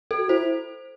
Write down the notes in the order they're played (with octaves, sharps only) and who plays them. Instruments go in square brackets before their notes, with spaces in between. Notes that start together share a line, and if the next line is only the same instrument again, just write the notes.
[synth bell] A4
[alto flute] F#4
[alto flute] E4 [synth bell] C5